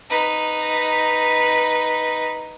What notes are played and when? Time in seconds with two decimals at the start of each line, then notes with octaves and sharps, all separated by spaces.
0.10 D#4 B4